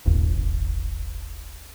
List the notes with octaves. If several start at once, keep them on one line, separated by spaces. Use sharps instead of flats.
D#1 G#1 D#2